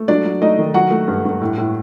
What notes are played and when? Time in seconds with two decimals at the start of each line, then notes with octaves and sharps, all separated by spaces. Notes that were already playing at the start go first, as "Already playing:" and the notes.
Already playing: A3
0.08 F#3 D4 D5
0.25 F#3
0.42 A3 D#4 D#5
0.58 D#3
0.74 F#3 F#4 F#5
0.91 A3
1.08 G2
1.25 G2
1.41 A2
1.58 A2